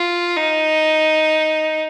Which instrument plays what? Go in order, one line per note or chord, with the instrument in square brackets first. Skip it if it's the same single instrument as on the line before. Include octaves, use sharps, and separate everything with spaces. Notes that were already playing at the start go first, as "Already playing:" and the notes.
Already playing: [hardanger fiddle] F4
D#4